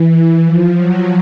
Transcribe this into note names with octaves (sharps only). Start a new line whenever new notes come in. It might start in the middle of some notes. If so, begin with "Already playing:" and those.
Already playing: E3
E3
F3
F#3